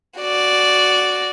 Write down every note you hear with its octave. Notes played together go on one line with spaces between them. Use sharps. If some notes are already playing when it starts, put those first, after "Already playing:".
F#4 D5